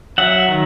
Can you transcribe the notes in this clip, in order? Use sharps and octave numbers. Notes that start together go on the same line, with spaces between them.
F#3 E5 F#5
D#3